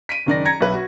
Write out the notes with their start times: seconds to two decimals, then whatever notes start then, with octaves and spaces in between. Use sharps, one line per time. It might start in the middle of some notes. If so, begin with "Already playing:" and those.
0.09 B6 D7 D#7
0.26 F#1 D#3 D5 A#6
0.45 A#5 G#6 A#6 C#7
0.61 B1 B4 E5
0.74 F#4